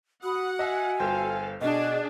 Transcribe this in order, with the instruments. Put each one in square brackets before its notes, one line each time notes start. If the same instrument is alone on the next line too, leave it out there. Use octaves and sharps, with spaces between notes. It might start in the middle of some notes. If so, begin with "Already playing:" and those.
[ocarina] F#4 [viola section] F#5 [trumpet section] B5 D#6
[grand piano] D#5 E5 [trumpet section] G#5
[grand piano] G1 C5 G5 [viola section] A4 F5
[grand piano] B2 [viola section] D4 G#4 [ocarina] D#5